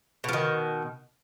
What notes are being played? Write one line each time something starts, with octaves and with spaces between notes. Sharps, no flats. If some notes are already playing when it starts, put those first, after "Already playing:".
B2 D#3 F3